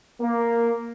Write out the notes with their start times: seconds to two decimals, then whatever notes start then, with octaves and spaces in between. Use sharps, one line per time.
0.20 A#3